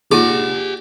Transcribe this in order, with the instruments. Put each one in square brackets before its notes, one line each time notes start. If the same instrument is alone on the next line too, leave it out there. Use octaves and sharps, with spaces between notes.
[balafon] A#3 D#4 F4 [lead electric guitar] G4 F#5 [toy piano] G#4 [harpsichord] D5